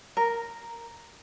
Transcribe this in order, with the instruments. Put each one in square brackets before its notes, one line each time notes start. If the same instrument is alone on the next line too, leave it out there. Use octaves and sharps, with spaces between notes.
[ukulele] A#4